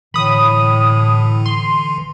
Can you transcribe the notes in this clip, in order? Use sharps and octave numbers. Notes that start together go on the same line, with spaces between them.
A2 D3 E3 B5 D#6
C6